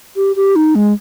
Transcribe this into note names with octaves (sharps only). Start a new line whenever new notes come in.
G4
G4
D#4
G#3